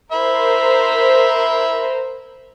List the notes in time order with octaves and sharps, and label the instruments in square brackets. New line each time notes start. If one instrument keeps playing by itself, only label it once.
[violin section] A#4 C5 [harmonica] E5 B5